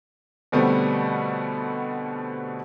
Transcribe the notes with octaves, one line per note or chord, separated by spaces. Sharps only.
B2 D3 G3 A3 B3 C4